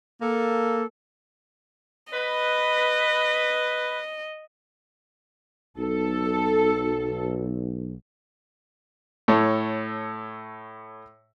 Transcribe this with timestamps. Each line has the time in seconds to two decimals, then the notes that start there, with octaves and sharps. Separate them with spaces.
0.22 A#3 A4
2.13 B4 D#5
5.78 B1 A4
9.28 A2 A4 C#5